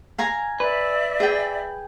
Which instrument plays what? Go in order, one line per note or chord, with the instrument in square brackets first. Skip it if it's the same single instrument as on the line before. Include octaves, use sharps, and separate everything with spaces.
[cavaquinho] F5 G#5 A#5
[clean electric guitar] B4 [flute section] D5 E5
[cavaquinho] G#4 G5